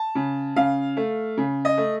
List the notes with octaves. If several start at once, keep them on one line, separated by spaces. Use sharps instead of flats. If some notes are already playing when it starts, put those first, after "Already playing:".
Already playing: A5
C#3
C#3 F5
A3
C#3
D#5
A3